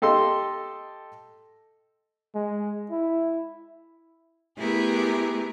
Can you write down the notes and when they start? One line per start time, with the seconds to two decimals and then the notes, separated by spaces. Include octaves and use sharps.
0.02 G4 A4 D#5 C6
2.35 G#3
2.91 E4
4.58 A3 B3 E4 G4 G#4 A#4